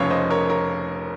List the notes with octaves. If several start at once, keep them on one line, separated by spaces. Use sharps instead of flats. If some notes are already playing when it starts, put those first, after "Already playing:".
Already playing: F1 F2 C#3 C#5 F5
C5 D#5
A#4 C#5
A#4 C#5